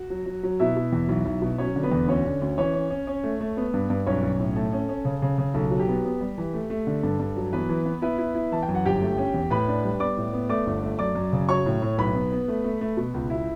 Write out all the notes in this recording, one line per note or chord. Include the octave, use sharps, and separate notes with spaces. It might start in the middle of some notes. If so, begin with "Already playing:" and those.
Already playing: F#4
F#3
F#3
F#3
B2 E4 E5
B2
E2
B1
B1
B2
F#3 C#4 C#5
D3
B3 B4
E2
D2 C#4 C#5
D3
D2
E3 C#4 C#5
C#4
C#4
C#4
A3
A3
B3
G2
G2
B1 C#4 C#5
B1
A2
A3 A4
C#4
C#4
C#3
C#3
C#3
B1 A4
F#3
G4
B3
B3
G3
E3
A3
A3
D3
G2 A4
G2
F#3
E3 B3 B4
E3
B3
B3 E4 B4
E4
E4
E3 A5
G5
F#2
F#5
G1 G4 G5
A3
C#4
E2
A2 B4 B5
D4
G3
B3 D5 D6
A2
B3
A3 D5 D6
G1
A3
F#2 D5 D6
F#2
C#3
F#3 C#5 C#6
A2
A2
B1 B4 B5
B3
B3
A3
A3
A3
B2
C#2
E4